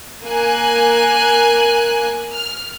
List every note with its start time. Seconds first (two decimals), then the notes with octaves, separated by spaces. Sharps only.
0.23 A#3 G#5 F#6
2.32 F6